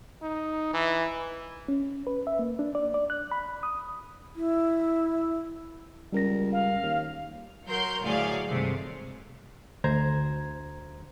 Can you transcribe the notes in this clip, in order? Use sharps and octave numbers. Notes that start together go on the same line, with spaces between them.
D#4
E3
C#4
B4
E5
A#3
D4
D5
D5
F#6
B5
D#6
E4
C#2 G3 A#4 A#6
F5
D#2
F#3 A#4 C6 G6
D2 A2 F#3 G#4 D5 F5
G2 C3 D#3 G#3 A3
D2 C5 A#5 G#6